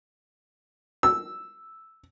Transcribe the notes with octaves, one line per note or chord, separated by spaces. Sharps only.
E6